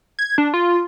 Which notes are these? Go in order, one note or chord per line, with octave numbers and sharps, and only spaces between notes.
G#6
D4
F4